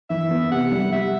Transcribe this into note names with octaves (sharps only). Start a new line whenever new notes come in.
E3 E5
B3
C3 F#5
G3
G3 E5